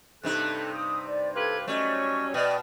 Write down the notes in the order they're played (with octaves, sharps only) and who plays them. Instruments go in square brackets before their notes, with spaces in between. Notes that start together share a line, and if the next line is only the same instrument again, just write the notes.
[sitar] G2 C3 D#4 [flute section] A4 F#6
[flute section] D#6
D5
[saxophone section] F4 G4 B4 [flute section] A4 G#6
[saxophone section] F#3 G3 C#4 [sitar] A3 [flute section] D#5 C#6
[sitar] B2 [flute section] B4 D5 G5 [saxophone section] D#5